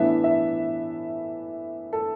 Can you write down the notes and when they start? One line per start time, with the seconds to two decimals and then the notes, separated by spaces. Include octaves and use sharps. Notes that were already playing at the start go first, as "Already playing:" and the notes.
Already playing: A2 E3 B3 D4 E5
0.24 E5
1.93 A4